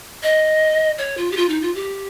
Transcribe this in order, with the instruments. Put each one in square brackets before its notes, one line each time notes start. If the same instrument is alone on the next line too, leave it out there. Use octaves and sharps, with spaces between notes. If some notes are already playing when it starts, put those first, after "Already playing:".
[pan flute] D#5
C#5
F4
G4
F4
D#4
F4
G4